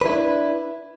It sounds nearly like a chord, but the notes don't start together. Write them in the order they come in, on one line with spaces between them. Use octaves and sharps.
B4 E4 D4